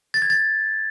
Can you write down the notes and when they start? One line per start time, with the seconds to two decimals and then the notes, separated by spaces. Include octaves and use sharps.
0.14 A6
0.22 G#6
0.30 A6